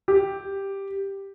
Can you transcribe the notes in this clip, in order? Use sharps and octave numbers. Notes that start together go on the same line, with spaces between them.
G4